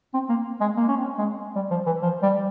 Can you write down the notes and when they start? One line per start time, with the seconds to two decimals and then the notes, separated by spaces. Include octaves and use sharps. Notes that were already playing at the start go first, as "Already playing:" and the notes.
0.14 C4
0.29 A#3
0.61 G#3
0.77 A#3
0.88 C#4
0.97 C4
1.18 G#3
1.56 G3
1.70 F3
1.86 E3
2.02 F3
2.23 G3